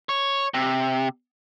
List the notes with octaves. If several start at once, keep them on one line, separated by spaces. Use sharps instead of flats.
C#5
C3